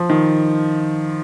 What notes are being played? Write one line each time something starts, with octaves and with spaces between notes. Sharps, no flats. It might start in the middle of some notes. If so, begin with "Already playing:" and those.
Already playing: F3
D#3